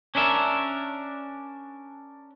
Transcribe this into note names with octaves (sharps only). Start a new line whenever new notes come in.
C#4 D4 A#4 E5